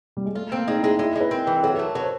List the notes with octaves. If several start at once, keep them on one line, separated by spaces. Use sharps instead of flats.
G3
G#3
A3 F4
A#3 C4
G#3 D#4
E4
G#3 D#4
G#3 E4
G#3
B4
C4 A#4
E3
F#3 A4
A4
A3
A#4
F#3 B4
C5